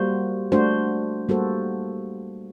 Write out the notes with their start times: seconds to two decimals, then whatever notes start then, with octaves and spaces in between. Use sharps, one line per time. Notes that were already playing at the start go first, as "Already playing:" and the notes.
Already playing: G3 A#3 F#4 C5
0.52 A3 D4 F#4 C5
1.29 G3 A#3 F#4 A4 C5